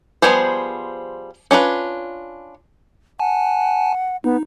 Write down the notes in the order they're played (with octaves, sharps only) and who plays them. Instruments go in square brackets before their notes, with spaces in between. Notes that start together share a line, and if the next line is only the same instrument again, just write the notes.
[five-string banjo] F3 G3 B3 G#4 C5
C#4 D4 F4 B4
[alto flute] F#5 [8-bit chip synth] G#5 A5
[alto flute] B3 [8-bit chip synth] D#4